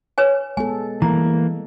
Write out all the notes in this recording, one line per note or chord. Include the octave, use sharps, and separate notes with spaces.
B4 C#5 G#5
G#3 B3 A4 G#5
E3 G3 G#3 A#3 A#5